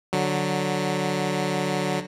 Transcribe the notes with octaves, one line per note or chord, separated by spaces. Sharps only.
D3 F#3